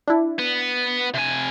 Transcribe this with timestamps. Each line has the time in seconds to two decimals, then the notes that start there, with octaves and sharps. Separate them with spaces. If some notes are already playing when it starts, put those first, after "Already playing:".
0.07 D4 E4
0.39 B3
1.14 C3 G#5